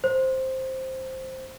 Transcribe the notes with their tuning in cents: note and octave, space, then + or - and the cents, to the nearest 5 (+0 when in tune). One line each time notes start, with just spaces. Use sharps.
C5 +5